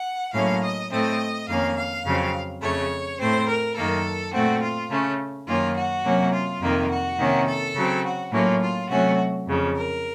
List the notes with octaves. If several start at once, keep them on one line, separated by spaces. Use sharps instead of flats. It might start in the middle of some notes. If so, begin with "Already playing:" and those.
Already playing: F#5
A2 F#3 A#3 C#4 F5
D#5
A2 A3 C4 D#5
F2 D#3 A#3 C#4 F5
F5
F2 C#3 F#3 C4
F2 C#3 A3 C#5
A2 A3 C4 C5
A#4
F#2 D#3 A#3 A4
A#2 A3 C4 F#4
F4
C#3 A3 C#4
F#2 D#3 A#3 C#4 F4
F#4
C3 F#3 A#3 C#4
F4
F2 C3 D#3 A#3
F#4
C3 D#3 A#3 C#4
A4
C#3 F#3 C4
F#4
A2 F#3 A#3 C#4 F4
F4
C3 F#3 A3 C#4 F#4
F2 C#3 F3
A#4